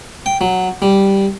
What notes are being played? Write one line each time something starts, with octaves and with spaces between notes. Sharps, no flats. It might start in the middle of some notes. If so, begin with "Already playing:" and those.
G5
F#3
G3